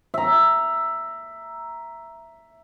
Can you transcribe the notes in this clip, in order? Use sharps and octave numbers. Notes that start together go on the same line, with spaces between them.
E5 A#5